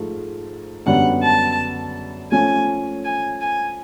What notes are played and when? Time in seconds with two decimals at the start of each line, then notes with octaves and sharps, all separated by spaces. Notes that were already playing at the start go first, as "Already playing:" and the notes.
Already playing: G#2 F3 A3
0.86 F#2 D3 G3 B3 F#5
1.23 A5
2.31 F3 A3 C#4 G#5
3.04 G#5
3.41 G#5